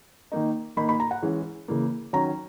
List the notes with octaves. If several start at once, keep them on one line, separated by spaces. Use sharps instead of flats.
D#3 A#3 D#4
D#3 A#3 D#4 B5
B5
A#5
F#5
E3 G#3 C#4
C#3 E3 A#3
D#3 F#3 C#4 A#5